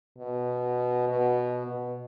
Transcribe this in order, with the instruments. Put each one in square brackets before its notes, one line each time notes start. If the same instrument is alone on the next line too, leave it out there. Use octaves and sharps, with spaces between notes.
[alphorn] B2
B2
B2